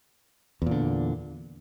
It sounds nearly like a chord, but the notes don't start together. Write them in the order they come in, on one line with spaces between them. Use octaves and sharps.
E2 A#2 D3